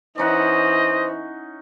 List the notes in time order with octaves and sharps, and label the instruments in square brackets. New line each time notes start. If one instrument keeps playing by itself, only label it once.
[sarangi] E3 [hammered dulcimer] C#4 D#4 F#5 [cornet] C5 [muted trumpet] D#5